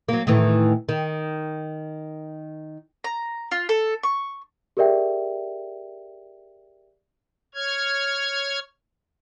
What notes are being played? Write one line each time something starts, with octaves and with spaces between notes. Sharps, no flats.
F#3 A#3
A2 D#3 E3
D#3
A#5
F4
A4
C#6
G4 G#4 A#4 D5 E5 G5
C#5 F6 G#6